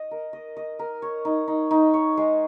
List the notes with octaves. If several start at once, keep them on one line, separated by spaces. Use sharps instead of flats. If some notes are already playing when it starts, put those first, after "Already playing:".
Already playing: D#5
A#4
D#5
D#5
A#4
C#5
D#4
D#4
D#4
C#5
G#3